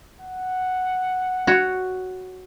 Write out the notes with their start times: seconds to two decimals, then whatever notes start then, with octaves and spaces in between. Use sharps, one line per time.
0.22 F#5
1.47 F#4 C#5